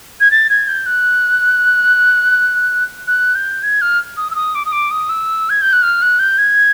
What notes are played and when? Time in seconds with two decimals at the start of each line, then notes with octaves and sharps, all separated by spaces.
0.20 G#6
0.31 A6
0.50 G#6
0.68 G6
0.86 F#6
3.07 F#6
3.35 G6
3.63 G#6
3.81 F6
4.17 D#6
4.31 E6
4.35 D#6
4.55 D6
4.65 D#6
4.72 D6
4.91 D#6
5.09 E6
5.50 G#6
5.62 G6
5.73 F#6
5.83 F6
6.02 F#6
6.19 G6
6.38 G#6